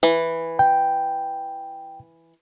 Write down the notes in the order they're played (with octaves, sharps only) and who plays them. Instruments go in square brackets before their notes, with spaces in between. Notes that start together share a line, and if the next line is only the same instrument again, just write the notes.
[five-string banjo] E3
[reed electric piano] G5